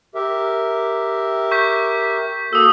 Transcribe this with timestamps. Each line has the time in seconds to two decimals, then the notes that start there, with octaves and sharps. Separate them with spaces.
0.15 G4 A#4 E5
1.51 C#6 G6 B6
2.53 A#3 F#4 A4 D#6 E6